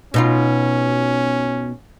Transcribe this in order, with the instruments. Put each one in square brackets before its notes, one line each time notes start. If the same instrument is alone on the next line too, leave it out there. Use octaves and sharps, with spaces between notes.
[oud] B2 D#4 F4 [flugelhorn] C#4